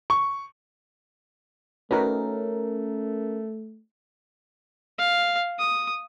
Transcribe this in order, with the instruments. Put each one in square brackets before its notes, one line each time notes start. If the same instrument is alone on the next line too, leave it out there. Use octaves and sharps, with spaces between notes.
[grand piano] C#6
[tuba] A3 [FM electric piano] C#4 A#4 [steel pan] D#4 F#4 B4
[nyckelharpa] F5
D#6